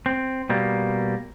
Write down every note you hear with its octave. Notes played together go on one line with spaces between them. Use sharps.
C4
B2 G3 A#3